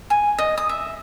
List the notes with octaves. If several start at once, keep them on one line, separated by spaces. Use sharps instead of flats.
G#5
D#5
D#6
E5